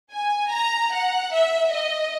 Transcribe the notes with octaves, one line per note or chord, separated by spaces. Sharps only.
G#5
A#5
F#5
E5
D#5